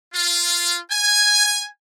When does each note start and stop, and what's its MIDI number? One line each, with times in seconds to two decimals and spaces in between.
0.14 0.79 65
0.91 1.67 80